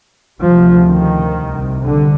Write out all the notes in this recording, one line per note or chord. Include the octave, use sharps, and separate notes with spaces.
D2 C3 F3
D#3
C2 C3
D3